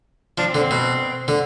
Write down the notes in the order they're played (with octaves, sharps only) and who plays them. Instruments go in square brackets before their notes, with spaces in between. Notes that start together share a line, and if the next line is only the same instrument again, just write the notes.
[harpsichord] F3 [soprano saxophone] D4
[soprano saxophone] C4
[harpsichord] D3
[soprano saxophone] C4
[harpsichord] B2
D3